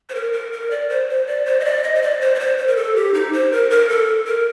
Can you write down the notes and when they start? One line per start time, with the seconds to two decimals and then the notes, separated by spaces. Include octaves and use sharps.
0.09 C5
0.15 A#4
0.33 A#4
0.52 A#4
0.71 D5
0.90 C5
1.09 C5
1.27 D5
1.45 C5
1.60 D#5
1.65 D5
1.84 D#5
1.95 C5
2.02 D5
2.21 C5
2.35 D5
2.40 C5
2.58 C5
2.67 A#4
2.76 A4
2.96 G4
3.14 D#4
3.33 C5
3.52 A#4
3.70 A#4
3.89 A4
4.27 A#4